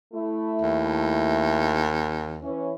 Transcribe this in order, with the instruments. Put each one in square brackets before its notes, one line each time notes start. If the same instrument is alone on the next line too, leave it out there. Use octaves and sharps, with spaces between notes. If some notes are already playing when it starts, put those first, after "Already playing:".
[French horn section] A3 E4
[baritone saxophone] D#2
[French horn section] E3 C#4